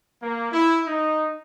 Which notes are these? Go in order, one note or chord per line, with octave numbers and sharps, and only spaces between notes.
A#3
E4
D#4